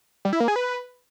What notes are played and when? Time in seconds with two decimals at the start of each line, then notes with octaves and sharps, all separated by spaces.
0.25 G3
0.33 E4
0.40 A#3
0.48 G#4
0.56 B4